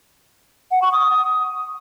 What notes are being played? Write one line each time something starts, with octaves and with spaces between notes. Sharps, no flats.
F#5
C#6
D#6